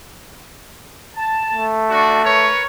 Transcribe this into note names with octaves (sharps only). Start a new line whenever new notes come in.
A5
A3
D4 F#4
A#4 B4 C#5